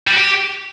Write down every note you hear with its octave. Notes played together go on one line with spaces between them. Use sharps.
G3
F#4
G4